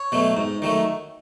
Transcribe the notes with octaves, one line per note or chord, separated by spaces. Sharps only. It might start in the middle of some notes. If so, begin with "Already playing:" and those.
Already playing: C#5
B2 F#3 A3
G#2
D#3 F#3 A3